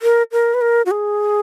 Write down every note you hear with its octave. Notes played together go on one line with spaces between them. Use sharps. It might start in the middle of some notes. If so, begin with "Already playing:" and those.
A#4
A#4
B4
A#4
F#4
G#4